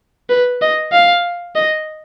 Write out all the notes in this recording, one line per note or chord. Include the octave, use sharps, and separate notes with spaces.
B4
D#5
F5
D#5